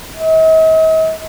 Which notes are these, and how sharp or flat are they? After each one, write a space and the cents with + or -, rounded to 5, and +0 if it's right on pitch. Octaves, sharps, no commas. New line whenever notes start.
D#5 +45